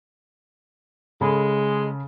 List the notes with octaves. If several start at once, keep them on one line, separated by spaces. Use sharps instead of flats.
C#3 G#3 A4 B5